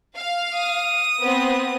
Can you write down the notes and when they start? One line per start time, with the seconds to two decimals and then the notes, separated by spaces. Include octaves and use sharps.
0.16 F5
0.56 D#6
1.20 B3 C4